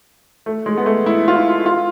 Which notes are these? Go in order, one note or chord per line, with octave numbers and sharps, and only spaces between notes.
A3
G#3
B3
A3
E4
F4
E4
F4